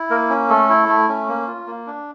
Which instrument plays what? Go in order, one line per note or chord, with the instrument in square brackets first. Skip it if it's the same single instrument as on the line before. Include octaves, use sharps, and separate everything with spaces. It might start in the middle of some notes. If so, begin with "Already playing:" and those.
Already playing: [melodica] E4
A#3 A#4
C#4
A3 A4
E4
A3
C#4
A#3
F4
A#3
D4